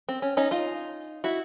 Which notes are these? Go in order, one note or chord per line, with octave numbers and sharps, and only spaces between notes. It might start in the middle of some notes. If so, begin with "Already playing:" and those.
C4
C#4
C#4 D#4
D#4 F4
E4 F#4